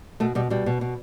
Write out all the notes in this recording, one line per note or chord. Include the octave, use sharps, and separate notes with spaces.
B2 A3
B2 G3
B2 G3
B2
B2